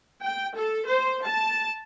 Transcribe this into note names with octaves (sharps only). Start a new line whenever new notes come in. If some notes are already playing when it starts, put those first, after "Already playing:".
G5
A4
C5
A5